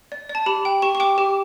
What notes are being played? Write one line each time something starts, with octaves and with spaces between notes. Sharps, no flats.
D5
D5
A5
G4 B5
G5
G4 C#6
C#6
G5 D6
G4